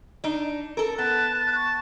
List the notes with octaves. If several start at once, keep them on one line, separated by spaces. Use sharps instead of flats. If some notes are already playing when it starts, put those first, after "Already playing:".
D4 D#4
A4 A#4
B3 A5 F#6
A5
C#6